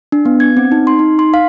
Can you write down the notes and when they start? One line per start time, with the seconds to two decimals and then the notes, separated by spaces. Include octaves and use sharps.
0.12 D4
0.25 B3
0.40 G#6
0.57 C4
0.72 D#4
0.87 C6
0.99 D#4
1.19 C6
1.34 F5